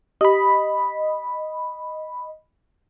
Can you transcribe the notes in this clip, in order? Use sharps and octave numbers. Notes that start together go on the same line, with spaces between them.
G4 D#5 B5